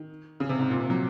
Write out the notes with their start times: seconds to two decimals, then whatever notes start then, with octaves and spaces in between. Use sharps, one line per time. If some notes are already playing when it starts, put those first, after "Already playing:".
Already playing: D#3
0.40 C#3
0.49 C3
0.59 G#2
0.70 A#2
0.80 C3
0.90 F#3